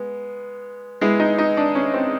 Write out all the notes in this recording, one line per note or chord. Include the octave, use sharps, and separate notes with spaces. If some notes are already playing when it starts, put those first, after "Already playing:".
Already playing: G#3 B3
G#3 B3 E4 G#4
D#4
D#4
D4
C#4
C4